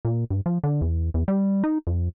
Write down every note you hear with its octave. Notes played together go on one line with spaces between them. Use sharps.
A#2
G2
F3
D3
E2
E2
G3
D#4
F2